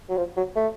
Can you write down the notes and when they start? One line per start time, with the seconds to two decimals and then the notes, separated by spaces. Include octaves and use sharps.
0.10 F#3
0.17 F3
0.37 F#3
0.56 A3